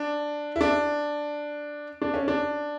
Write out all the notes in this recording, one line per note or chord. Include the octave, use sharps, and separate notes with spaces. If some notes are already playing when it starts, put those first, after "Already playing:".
Already playing: D4
E4
D4
D4
C#4
D4